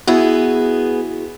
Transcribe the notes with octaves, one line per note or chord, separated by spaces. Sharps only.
B3 E4 F#4 G#4